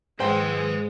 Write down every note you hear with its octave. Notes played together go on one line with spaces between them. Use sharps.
G#2 G#3 B4 C5 G5 G#5